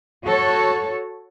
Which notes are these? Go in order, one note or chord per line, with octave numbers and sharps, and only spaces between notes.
F#4 A4 C#5